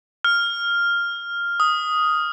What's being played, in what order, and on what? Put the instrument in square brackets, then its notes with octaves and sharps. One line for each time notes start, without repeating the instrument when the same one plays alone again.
[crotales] F6
D#6